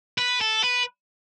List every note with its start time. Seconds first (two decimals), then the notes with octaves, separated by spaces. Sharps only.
0.18 B4
0.41 A4
0.64 B4